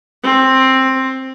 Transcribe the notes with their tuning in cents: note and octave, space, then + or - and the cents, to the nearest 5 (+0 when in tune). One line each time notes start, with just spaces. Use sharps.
C4 +10